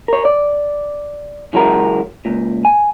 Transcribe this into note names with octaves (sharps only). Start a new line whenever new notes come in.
A#4 C#5
D5
C#2 E3 F#3 G#3 F#4 A#4
C#2 A#2
G#5